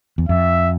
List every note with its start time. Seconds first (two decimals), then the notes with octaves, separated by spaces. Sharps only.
0.18 E2
0.29 F2 E5